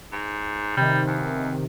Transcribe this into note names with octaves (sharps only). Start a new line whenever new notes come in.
G#2
C3 D#3 G3
E2